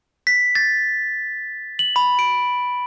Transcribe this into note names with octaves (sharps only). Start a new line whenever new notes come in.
B6
A6
F#7
B5
D7